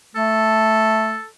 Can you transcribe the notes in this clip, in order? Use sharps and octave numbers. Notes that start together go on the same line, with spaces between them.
A3 A4